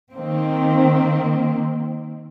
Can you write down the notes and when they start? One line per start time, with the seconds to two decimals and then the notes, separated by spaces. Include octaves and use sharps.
0.12 D#3 A#3 C4